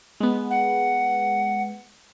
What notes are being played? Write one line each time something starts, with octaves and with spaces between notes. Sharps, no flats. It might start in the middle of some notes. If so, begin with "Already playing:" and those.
G#3 B3
F#5